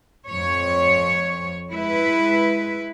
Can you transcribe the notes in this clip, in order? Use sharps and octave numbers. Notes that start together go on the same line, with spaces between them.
F2 C#5
G#3 E4 B4